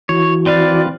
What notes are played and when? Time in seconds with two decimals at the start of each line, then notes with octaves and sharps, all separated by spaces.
0.09 E3 E4 F#4 C#5
0.46 C4 B4 D5 F5